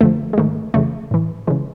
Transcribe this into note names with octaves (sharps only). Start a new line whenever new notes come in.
F#2 D3 F3 A3
G#3
G#2 D#3 A3
F2 C#3 E3 A3
A2 E3
C#3 E3 G#3